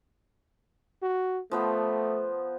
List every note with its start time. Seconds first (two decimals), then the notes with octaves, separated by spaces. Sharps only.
1.02 F#4
1.51 F3 A3 B3 C5